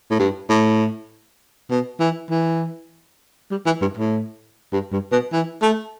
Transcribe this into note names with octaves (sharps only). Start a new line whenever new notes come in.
A2
G2
A2
B2
E3
E3
G3
E3
G2
A2
G2
G2
B2
E3
A3